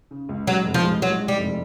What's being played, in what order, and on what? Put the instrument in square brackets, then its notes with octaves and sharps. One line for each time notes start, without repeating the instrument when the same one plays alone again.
[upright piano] C#3
C#2
[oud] F#3 [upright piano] G#3
[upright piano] F1
[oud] F3
[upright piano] G#3
[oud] F#3 [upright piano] G#3
[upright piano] G#3
[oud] G3
[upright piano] F1